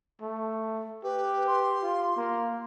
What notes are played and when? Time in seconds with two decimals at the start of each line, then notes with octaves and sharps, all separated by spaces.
0.21 A3
1.04 G4 B4
1.47 C6
1.83 F4
2.16 A#3